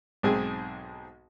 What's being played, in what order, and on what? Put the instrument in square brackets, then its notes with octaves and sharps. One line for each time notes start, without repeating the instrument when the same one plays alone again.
[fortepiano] B1 G#2 C4 G#4